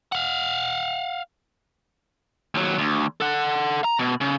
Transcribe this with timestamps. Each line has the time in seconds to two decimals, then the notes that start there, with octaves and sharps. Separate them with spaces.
0.12 F5 F#5
2.55 D#2 F#3
2.78 D2
3.21 A4 F#5
3.84 A#5
3.99 B2
4.21 C#3